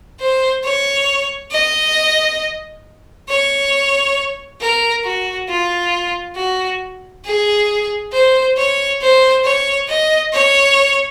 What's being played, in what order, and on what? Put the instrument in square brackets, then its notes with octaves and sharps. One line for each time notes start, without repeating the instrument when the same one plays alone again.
[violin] C5
C#5
D#5
C#5
A#4
F#4
F4
F#4
G#4
C5
C#5
C5
C#5
D#5
C#5